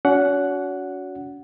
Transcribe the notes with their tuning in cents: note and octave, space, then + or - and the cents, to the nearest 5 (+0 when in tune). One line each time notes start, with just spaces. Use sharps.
C#4 +45 F#4 -5 F#5 +0